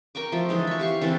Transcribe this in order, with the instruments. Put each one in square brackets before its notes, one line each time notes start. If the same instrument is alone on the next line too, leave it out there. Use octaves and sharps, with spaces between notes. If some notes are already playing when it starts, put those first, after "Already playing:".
[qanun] A#4 G5 C#6 D6
F3 A3
D3 E3 G#3 D#4
E5 C#6
G4 F5 C#6
D3 E3 A3 C4